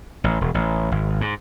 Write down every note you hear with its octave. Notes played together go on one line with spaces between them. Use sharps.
A1
E1
A1
G#1
G#2